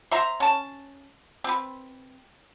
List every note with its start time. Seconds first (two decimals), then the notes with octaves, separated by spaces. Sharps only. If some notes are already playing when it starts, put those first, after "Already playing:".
0.11 C5 E5 A#5
0.40 C#4 A5
1.44 C4 B4